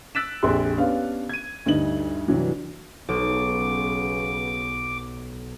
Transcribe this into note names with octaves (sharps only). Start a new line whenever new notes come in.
E6 F#6 A6 B6 D7 E7
A#1 F2 C4 G4 G#4 C6
B3 C#4 D4 G4 B4 F5
G#6 D#7
D2 G2 D#4 F#7
C2 G2 E3 F#3
B1 C#3 B3 D6